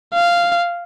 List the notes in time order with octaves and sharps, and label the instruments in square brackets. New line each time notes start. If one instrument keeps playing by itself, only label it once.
[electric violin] F5